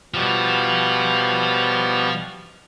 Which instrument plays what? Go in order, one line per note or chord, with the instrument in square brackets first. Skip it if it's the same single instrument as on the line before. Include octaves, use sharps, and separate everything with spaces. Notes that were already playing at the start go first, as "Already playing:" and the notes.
[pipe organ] B2 G3 [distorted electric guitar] F3